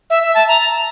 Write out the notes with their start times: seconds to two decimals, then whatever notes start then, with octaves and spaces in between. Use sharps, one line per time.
0.10 E5
0.22 E5
0.34 A5
0.48 A#5